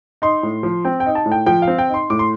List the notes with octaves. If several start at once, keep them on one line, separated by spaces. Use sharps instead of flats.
D#4 C6
A2
F3
C4 G5
G5
D#4
A5
A2
G5
F3 G5
F5
C4
G5
D#4 C6
A2 D6
C6